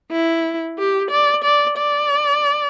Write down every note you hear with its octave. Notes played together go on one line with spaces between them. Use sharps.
E4
G4
D5
D5
D5